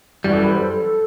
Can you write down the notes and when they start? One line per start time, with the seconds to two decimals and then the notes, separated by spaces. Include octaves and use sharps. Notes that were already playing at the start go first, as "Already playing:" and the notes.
0.24 F#2 E3 G3 F#4
0.33 A4
0.43 B4
0.52 C5
0.61 A4